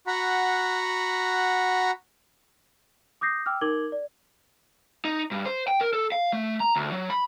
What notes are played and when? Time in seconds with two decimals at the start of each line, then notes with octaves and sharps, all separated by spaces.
0.07 F#4 F#5 A#5 B5
3.21 D6 D#6 G6 A#6 C7
3.46 G5 D6 E6 F6
3.61 D#4 A#4 D6 G#6 F#7 G7
3.92 D5
5.05 D#4
5.32 G2
5.45 C5
5.68 G5
5.81 A#4
5.93 A4
6.12 F5
6.33 A3
6.60 A#5
6.76 D2
6.92 F#3
7.10 B5